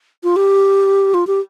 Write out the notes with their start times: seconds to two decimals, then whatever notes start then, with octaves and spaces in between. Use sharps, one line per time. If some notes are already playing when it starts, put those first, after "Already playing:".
0.24 F4
0.36 G4
1.14 F4
1.27 G4